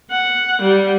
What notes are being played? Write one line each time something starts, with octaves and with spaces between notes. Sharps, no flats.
F#5
G3